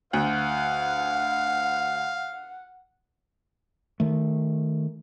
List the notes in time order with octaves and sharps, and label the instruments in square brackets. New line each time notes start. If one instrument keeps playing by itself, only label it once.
[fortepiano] D2 [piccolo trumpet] F5 [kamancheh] F#5
[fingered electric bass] D#3 A3